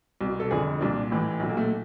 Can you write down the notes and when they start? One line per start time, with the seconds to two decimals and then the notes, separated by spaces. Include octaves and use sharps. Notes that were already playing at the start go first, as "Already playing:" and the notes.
0.21 C2 B2
0.40 A4
0.51 F1 F2 D3 G#4
0.81 C2 A#2 D4
1.11 A1 A2 E3
1.40 B1 A#2 A3
1.49 A#3
1.57 A3